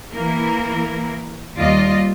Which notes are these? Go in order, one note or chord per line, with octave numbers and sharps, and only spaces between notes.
E3 A#3 E4 A#4
D#2 G3 F4 D5 D#5